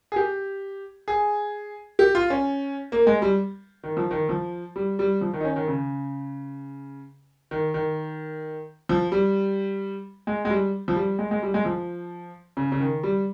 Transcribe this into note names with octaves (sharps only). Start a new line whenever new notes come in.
G#4
G4
G#4
G4
F4
C#4
A#3
G#3
G3
D#3
F3
D#3
F3
G3
G3
F3
D#3
D#4
C#4
D#3
C#3
D#3
D#3
F3
G3
G#3
G#3
G3
F3
G3
G#3
G#3
G3
G#3
F3
C#3
C#3
D#3
G3